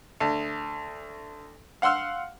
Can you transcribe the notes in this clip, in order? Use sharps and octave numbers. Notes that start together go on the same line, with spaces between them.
D2
F5 F#5 C6 E6 F6